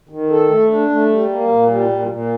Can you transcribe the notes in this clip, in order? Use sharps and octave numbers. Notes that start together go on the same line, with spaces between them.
D#3
A4
A3
D4
A3
G3
A#3
A#2
G3
A#2
A#2